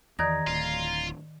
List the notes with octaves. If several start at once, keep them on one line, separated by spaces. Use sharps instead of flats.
E2 D#3 E3 D5 A#5 D#6 G#6 A#6
D1 F4